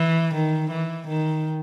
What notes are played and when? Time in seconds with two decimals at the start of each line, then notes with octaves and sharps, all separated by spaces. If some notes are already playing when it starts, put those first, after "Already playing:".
Already playing: E3
0.35 D#3
0.71 E3
1.08 D#3